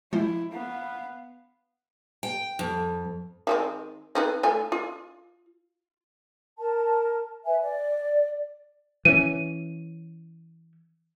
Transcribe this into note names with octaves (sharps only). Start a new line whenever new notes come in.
F3 G#3 E4 C5
B3 F5
G5
F2
D#3 G#3 C4
C4 D#4 B4
A3 F4 G#5
F4
A#4 A5
B4 E5 G#5
D5
E3 C#4 D#7